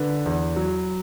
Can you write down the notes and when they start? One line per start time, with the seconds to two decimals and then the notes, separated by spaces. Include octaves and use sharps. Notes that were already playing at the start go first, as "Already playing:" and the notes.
Already playing: D3 B4
0.26 E2
0.56 F#3